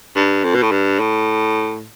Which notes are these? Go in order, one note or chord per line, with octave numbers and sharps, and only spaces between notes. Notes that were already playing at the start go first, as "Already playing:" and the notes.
G2
F2
B2
A2
G2
A2